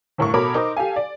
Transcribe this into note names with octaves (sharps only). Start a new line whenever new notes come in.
G1 A2 A#4 C#6
B2 A4 A#4 C#5 B5 D6
D#4 A#4 C5 D6
G4 A4 F5 G#5
D5